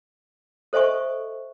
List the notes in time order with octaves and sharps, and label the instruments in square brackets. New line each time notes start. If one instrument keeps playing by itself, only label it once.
[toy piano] A4 C5 D#5 E5 G#5 C#6